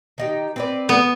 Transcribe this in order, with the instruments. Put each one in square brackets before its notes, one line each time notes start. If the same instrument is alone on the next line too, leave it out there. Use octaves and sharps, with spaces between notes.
[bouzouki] D#3 D#4 G4
C4 B4 D5
[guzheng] B3